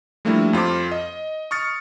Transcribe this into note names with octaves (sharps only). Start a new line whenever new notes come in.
F3 G3 A3 A#3 D4 E4
F2 F4 C5 D6
D#5
C#6 D#6 F6 A6 C#7